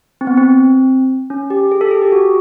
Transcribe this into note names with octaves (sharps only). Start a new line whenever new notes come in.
C4
B3
C4
C#4
G4
G#4
G4 A4
G#4
G4
F#4